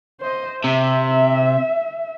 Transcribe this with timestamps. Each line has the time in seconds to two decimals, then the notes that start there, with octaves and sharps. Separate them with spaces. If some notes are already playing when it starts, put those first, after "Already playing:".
0.20 C5 D#5
0.64 C3 E5